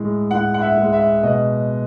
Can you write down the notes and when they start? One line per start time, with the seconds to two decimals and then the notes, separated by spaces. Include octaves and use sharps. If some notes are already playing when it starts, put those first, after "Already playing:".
Already playing: A2 G#3
0.31 A2 F#5
0.54 F#5
0.61 E5
0.77 G#3
0.93 E5
1.23 B2 D#5